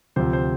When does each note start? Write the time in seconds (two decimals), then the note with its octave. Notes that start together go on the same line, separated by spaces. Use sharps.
0.16 D2 C3 F3 C5
0.33 C5